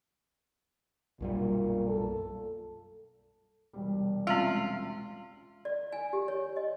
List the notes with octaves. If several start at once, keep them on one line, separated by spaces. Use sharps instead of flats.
B1 F#2 A#2 G3
A4
E1 C2 G3
G#3 C4 C#4 F4
D5
G#5
G4
C#5
D#5